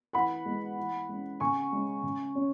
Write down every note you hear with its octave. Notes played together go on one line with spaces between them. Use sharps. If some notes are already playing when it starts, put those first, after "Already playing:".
E3 F#5 B5
G#3 B3
E3
G#3 C#4
C#3 G#5 C#6
G#3 C#4
C#3
C#4